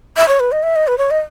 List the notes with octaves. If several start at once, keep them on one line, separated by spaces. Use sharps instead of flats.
E5
C#5
B4
D#5
E5
D#5
B4
C#5
D#5